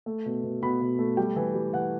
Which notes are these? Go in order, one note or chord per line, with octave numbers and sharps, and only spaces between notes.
A3
B2
B2
B2 B5
B2
A3
G3 G5
E3
G3
E3 F#5